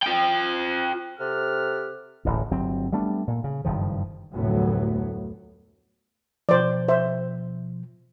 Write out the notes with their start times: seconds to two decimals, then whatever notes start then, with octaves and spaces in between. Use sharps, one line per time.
0.03 F4 G5
1.19 C3 G4 A4 F#5 F6
2.25 D1 A1 A2
2.51 G1 F#3 C4
2.93 G3 A3 B3 D4
3.27 A#2
3.44 C#3
3.65 F#1 G2 D#3 F3
4.33 F1 D2 A2 F#3 B3
6.49 B2 F3 C5 D5
6.88 C5 E5